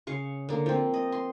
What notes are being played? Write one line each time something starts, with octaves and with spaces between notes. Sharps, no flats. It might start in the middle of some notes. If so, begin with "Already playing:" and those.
C#3 F5 C#6
D3 A#3
F3 C4
D#5
C6